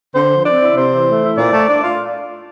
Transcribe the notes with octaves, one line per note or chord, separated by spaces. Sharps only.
D3 C5
F3
C4 D5
E4
C3 C5
E3
A3
E4
A#2 D5
A3
D4
F4